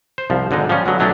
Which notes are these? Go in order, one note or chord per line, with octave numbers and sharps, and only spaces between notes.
C5
C2 F3
G#1 D3 G#3 D#4
F3 G3 A#3 C#4
D3 F#3 G#3 B3
B1 F#3 A3 C#4 D4 G5